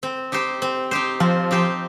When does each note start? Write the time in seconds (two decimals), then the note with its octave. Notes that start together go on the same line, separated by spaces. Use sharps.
0.03 C4
0.32 D#4 G4 C5
0.62 C4
0.91 D#4 G4 C5
1.20 F3 C4
1.51 D#4 G4 C5